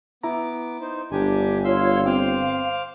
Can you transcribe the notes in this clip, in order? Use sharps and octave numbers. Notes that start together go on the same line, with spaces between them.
B3 E4 A#5 D6
D#4 C5
G1 D4 G4 G#5
F4 C#5 F5 C6 E6
C4 C5 F5 G5 D6 F6